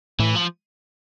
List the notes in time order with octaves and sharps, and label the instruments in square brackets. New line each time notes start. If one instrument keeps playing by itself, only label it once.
[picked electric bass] A2 [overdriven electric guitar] E3
[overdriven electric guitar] F3